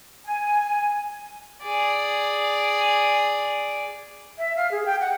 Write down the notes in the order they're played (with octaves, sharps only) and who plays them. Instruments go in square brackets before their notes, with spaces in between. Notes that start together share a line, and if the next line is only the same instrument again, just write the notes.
[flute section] G#5
[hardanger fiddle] G#4 D5
[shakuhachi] E5
F5
G#4
G5
F#5